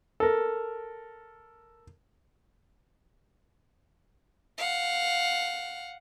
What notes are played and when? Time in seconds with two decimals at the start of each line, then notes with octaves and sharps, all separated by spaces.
0.20 A4 A#4
4.58 F5 F#5